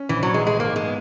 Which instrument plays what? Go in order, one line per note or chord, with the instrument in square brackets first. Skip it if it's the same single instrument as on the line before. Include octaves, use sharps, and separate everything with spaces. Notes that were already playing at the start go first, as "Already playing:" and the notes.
Already playing: [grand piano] C#4
[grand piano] A#1 [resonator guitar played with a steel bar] E3
[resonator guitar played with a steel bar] F#3
[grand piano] E3 [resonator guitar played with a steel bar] G#3
[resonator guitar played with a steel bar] G#3
[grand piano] G#2 [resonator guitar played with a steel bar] A#3
[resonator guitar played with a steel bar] G#3
[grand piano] B3